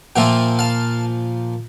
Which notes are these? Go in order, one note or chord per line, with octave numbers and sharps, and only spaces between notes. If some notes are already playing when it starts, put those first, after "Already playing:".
A#2 F3 A#3 F4 E5 G5
F5 A5